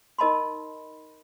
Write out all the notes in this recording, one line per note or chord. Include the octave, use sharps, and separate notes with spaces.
D#4 A#4 D#5 A5 B5 C6